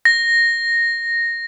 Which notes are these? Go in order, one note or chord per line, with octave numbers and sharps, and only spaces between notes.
A#6